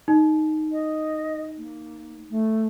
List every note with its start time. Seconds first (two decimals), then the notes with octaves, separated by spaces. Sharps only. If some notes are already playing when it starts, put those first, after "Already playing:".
0.08 D#4
0.72 D#5
1.57 A#3
2.30 A3